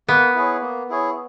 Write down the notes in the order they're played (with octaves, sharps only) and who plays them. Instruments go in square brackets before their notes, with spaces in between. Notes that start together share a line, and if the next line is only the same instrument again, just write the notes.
[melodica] A#3 [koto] B3
[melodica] E4 G#4 C#5
A#3
E4 G#4 C#5